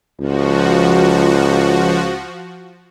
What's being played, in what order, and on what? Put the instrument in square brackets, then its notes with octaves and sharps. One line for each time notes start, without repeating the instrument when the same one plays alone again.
[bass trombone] C#2 [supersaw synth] F3 F#4